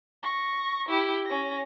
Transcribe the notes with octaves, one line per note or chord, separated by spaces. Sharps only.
C#6 A#6
E4 G4
C#4 A#6